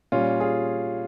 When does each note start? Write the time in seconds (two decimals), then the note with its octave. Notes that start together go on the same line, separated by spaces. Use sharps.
0.12 A#2 G3 C#4 F4
0.40 F4 G#4